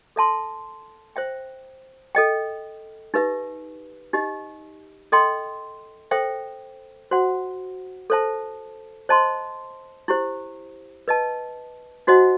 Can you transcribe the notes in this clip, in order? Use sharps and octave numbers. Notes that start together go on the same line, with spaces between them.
A4 E5 A5 C6
C5 E5 G5
A4 D#5 G5
D#4 G4 B4 E5
D#4 G4 D#5
A4 D#5 G5 C6
A4 C5 E5 G5
F#4 C5 F#5
A4 C5 E5 A5
C5 D#5 A5 C6
E4 G4 C5
B4 D#5 A5
D#4 F#4 C5 D#5 F#5